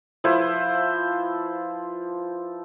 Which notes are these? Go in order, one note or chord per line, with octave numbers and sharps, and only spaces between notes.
F3 E4 B4 C5